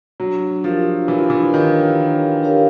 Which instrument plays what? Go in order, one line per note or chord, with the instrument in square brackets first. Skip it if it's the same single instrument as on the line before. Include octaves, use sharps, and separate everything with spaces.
[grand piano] F#3 [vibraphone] D4
[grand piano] F3 [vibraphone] G4 A#4 C#5 F5
[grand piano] E3 [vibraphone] D4
[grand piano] F3
E3
[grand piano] D#3 [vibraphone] G4 A#4 C#5 F5
[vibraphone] D4
G4 A#4 C#5 F5